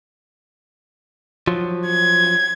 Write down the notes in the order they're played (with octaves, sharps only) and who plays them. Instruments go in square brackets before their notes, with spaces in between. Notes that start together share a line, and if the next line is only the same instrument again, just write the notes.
[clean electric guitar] F3 F#3
[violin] G#6